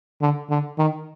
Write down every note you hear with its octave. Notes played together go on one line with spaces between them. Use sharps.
D3
D3
D#3